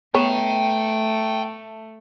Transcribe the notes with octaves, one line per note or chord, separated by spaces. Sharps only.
A3 B3 C#5 G5 A#5